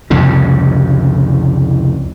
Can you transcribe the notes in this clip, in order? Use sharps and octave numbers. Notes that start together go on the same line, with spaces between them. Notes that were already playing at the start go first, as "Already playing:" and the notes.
C2 F2 A2 C#3